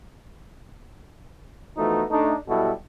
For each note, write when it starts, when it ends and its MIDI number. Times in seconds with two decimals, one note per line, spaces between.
1.77 2.03 52
1.77 2.03 53
1.77 2.03 57
1.77 2.03 59
1.77 2.03 63
1.77 2.03 66
2.11 2.34 57
2.11 2.34 62
2.11 2.34 63
2.48 2.71 47
2.48 2.71 54
2.48 2.71 55
2.48 2.71 64
2.48 2.71 66
2.48 2.71 69